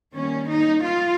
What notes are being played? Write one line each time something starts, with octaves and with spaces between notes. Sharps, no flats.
D#3 G3 A#3 C#4
D#4
F4